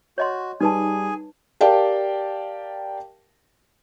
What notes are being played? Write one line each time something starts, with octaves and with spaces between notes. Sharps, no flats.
F#4 C#5 D#5 C6
G3 D#4 G#4 B4 G#5 A5
G4 A#4 D5 F5 G5 A5